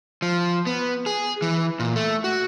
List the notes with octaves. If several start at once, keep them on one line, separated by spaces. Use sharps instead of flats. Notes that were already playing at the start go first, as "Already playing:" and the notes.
F3
B3
G#4
E3
A#2
A3
F#4